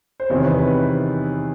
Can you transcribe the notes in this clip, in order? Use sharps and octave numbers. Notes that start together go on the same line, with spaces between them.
C5
E2 C3 D#3 C#5
B4
B4